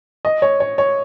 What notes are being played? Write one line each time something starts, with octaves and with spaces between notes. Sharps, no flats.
D#5
C#5
C#5
C#5